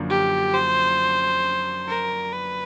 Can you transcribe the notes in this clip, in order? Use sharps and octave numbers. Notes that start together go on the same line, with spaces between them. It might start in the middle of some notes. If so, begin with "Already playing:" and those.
Already playing: F#2 D3 F3 A#3 D4
G4
C5
A#4
B4